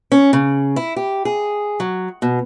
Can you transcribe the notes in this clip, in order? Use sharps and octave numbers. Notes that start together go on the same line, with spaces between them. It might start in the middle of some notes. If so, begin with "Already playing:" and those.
C#4
C#3
E4
G4
G#4
F#3
B2